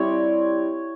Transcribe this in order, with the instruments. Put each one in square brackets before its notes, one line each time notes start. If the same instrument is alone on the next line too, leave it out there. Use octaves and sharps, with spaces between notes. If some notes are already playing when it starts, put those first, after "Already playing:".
Already playing: [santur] G3 C4 E4 C#5